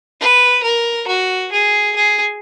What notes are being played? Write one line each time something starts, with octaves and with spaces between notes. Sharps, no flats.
B4
A#4
F#4
G#4
G#4